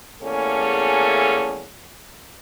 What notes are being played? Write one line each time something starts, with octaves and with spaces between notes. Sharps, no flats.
E2 A3 A#3 C#4 G#4 A4